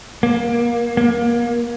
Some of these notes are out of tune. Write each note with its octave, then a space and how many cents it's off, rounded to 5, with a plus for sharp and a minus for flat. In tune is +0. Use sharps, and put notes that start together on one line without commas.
A#3 +25
A#3 +25